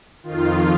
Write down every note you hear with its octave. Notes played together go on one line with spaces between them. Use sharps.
F2 D#3 F4